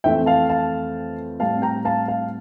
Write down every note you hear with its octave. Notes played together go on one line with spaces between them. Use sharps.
F2 E3 A3 C4 E5 G5
F5 A5
F5 A5
A2 G3 C4 F5 A5
G5 A#5
F5 A5
F5 A5